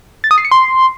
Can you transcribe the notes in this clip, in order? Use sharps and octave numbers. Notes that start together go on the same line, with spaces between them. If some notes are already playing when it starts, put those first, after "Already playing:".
A6
D#6
C7
C#7
C6